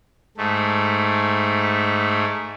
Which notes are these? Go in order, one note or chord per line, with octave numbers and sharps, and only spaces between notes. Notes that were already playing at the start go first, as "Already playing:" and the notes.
G#2 A3